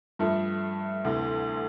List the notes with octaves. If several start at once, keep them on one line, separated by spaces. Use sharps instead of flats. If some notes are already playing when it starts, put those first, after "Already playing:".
G2 F3 A3
D2 C3 E3